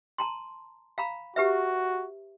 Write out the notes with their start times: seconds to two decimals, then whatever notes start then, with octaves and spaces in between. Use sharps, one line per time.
0.18 A5 A#5 C6
0.98 F5 A#5 B5
1.36 F#4 G4 B4 E5